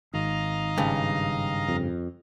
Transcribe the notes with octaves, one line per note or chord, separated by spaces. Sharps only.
G#1 D#3 D#5 F5 A#5
G2 C#3
F2